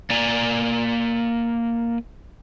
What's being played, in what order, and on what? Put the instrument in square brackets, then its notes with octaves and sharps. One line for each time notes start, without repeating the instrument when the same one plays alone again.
[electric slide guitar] A#3 D5 G#5 A#5